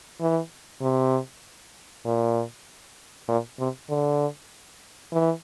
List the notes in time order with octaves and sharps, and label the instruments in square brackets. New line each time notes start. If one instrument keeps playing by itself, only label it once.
[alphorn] E3
C3
A#2
A#2
C3
D3
E3